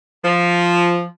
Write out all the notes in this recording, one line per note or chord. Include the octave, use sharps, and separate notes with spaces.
F3